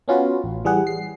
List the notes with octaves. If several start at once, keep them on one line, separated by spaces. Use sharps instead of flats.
B3 C#4 F4 F#4 B4
A1
E3 G3 G#4 F#5
C7